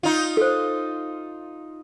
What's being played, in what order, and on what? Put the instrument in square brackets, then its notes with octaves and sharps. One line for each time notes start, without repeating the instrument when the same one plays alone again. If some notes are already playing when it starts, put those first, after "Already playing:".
[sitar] D#4 F4
[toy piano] A4 C5